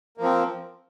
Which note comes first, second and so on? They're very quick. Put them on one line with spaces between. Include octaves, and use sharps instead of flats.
A#3 F3 C4